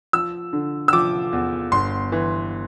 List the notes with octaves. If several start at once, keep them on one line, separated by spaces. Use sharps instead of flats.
F3 E6
D3
E6
F3 D6
E2
G1 C6
E3